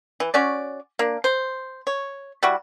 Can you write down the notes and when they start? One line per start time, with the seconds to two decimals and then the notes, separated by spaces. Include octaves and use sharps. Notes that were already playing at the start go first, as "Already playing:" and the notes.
0.20 E3
0.34 C#4 F#4 D5
0.99 A#3 D4
1.24 C5
1.87 C#5
2.43 G3 E4 F#4